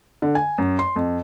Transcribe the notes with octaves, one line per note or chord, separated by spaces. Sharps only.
D3
G#5
F#2
C6
F2